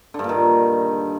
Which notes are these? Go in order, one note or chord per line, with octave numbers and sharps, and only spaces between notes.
G2 A#2 D3 D#3